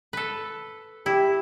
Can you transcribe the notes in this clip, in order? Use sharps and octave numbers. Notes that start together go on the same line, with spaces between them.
A4 B4
E4 G4